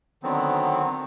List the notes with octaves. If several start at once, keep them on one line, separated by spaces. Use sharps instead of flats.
D3 D#3 F#3 B3 C4